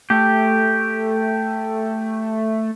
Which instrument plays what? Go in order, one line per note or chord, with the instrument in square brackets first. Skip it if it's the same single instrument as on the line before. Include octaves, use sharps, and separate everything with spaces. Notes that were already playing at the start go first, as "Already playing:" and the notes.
[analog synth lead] A3 [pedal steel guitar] G4